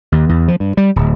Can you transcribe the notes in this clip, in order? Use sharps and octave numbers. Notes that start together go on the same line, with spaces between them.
D#2
E2
F3
G2
G3
D1